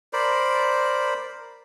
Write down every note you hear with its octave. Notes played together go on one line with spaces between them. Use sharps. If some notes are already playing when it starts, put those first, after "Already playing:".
A#4 C5 D5 B5